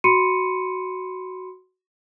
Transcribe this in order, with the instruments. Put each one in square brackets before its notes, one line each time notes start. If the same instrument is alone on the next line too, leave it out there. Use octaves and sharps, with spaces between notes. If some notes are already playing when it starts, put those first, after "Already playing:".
[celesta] F#4 B5 C6 C#7 D#7